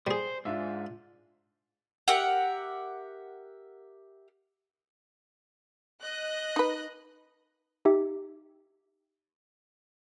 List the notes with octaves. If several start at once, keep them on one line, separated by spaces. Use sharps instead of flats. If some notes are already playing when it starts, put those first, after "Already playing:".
G3 G#4 C5
G#2 D4 F4 E5
G4 A#4 E5 F#5
D#5 F#6
D#4 B4
D#4 G4 E5